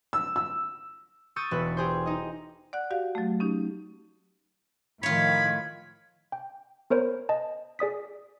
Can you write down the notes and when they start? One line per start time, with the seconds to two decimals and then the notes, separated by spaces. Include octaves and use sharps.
0.13 E6
0.36 E6
1.36 C#6 D#6 E6 G6 A6
1.51 E1 F#4 B4
1.77 G4 G#4 C5
2.06 D#4 D#5
2.73 D5 F#5 F#6
2.91 F#4 G4 D5 F5
3.15 F#3 A3
3.40 C#4 D#4 G4
5.03 A2 D#3 F3 F4 C#5 B5 G#6
6.32 G5
6.90 B3 A#4 C5 C#5 B5
7.29 D#5 A5
7.79 G#4 D5 D#6 B6